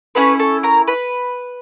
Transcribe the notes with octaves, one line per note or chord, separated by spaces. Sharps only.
C#4 E4 A4 B4 B5
A4 A5
A#4 A#5
B4 B5